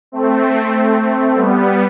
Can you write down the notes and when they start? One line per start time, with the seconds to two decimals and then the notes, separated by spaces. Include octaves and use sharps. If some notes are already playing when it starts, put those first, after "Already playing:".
0.12 A3 C4
1.35 G3 B3